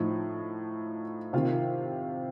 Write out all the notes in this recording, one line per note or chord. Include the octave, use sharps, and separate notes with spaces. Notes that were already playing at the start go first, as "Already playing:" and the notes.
Already playing: A2 F3 D#4
C3 D#3 F4 F5